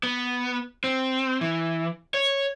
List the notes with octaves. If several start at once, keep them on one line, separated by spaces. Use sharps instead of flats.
B3
C4
E3
C#5